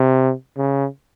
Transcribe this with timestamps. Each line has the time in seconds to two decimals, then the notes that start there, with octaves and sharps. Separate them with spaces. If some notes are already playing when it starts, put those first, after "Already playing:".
Already playing: C3
0.57 C#3